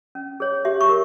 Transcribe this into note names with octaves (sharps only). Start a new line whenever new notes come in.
C#4
G#4 C#5
G4 E5
C#6
A#4